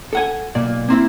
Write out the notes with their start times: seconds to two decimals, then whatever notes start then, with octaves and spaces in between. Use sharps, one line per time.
0.13 A4 F#5 G#5
0.55 B1 A#2 D5
0.88 A#3 C4 E4